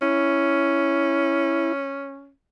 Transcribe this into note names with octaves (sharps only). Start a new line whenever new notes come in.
C#4 E4